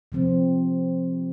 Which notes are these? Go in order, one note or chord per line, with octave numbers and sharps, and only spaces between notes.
C3 F3 C4